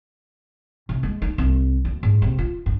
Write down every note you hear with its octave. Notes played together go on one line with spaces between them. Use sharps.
C3
G#3
D#4
C2
D2
G#2
C3
F4
G2